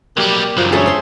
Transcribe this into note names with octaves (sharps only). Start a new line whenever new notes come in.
B1 G3 A#3 G4
C#2 F#2 F3
D2 C#3 G#4 A4 C#5 E5
C5 C6